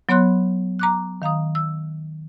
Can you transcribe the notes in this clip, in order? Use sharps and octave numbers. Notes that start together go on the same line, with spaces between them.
F#3 B3 C#5 B5 C6 F#6
A#5 D6 F#6
D#3 F5 A#5 D#6
E6